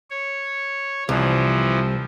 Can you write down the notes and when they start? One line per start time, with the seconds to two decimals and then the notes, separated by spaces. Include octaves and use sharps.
0.10 C#5
1.09 C2 E3 F3